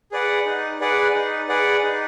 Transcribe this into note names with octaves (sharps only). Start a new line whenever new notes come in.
G#4 B4 D5 F#5
D#4
G#4 B4 D5 F#5
D#4
G#4 B4 D5 F#5
D#4